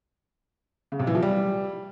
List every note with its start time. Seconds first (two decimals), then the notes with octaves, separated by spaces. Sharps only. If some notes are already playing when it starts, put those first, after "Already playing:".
0.92 C#3
1.00 C3
1.07 E3
1.15 F3
1.22 G3